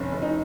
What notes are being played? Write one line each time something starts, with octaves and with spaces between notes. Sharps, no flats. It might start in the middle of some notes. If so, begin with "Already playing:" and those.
Already playing: F1 C#4
F1
D#4